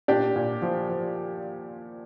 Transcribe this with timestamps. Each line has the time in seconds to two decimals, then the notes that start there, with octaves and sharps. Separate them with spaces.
0.08 A#2 D4 G4
0.36 A#2
0.62 F3
0.89 F3